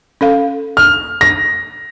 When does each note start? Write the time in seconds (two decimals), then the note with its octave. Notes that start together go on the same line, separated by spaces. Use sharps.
0.21 C#4 A4 F5
0.77 F6
1.21 A#6